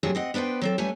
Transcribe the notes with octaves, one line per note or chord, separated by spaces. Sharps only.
G2 C3 F#3 A3 G#4
C4 D#5 F#5
B3 D4 B4 C5 G5
F#3 C4 A4
G3 A3 C#4 B4 G#5